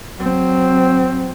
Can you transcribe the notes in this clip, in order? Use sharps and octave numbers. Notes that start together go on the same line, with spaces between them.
F#3 C4